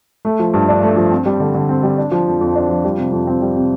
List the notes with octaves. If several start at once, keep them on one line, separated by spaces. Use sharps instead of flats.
A3
F3
G2
D4
A3
F3
C4
G3
D3
D3
C4
G3
D4
F3
F2
F2
D4
F3
G3
C3
F2
C4
G3
C3